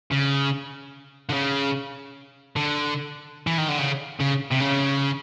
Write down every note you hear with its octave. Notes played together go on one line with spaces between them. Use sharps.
C#3
D3
C#3
D3
E3
D#3
D3
C#3
C#3
C3
C#3